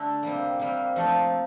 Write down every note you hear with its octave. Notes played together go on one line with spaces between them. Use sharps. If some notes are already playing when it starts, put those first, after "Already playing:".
Already playing: D3 A3 D4 A4
C3 G3 A#3
C3 G3 A#3
F3 A3 D#4 A4